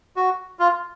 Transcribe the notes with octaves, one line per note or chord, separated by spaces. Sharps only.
F#4
F4